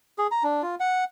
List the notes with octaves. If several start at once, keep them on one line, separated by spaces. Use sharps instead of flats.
G#4
A#5
D4
F4
F#5